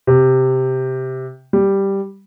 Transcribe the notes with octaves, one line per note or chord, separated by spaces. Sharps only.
C3
G3